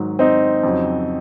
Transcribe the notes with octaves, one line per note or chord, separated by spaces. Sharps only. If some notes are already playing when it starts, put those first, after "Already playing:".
Already playing: G#2 D#3 F#3
C4 D#4
F2 C#3 F#3